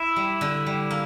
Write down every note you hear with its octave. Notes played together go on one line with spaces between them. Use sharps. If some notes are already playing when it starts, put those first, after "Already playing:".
Already playing: E4 E5
G3
D3
G3
A#3